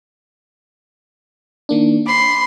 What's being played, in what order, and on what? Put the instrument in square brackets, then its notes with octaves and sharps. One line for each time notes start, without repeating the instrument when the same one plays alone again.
[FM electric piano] D#3 A#3 D4
[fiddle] B5 C6 [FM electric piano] D6